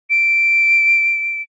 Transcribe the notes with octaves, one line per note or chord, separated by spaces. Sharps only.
D7